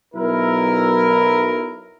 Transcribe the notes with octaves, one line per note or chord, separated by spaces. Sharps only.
B1 E4 A#4